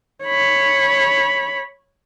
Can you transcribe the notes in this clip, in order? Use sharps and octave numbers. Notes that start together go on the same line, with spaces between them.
C#5 B5